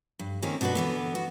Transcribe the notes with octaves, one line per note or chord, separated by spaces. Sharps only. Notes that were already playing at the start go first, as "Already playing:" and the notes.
G2
D#3 A#3 C4 C#4
B2 D4 F#4 G#4 B4
D3 E3 B3
F#4